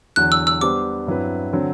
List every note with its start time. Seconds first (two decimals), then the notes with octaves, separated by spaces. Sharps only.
0.16 E2 D3 F#3 F#6
0.32 E6
0.47 E6
0.61 G3 B3 D4 G4 C5 D6
1.07 G2 F#3 C4 E4 B4
1.53 D3 F#3 C4